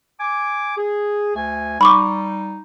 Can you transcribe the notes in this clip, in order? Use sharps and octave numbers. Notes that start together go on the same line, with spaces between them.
G#5 D6
G#4
D2 A3 G#5
G3 D#4 B5 C#6 D6